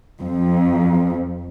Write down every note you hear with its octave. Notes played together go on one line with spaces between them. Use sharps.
F2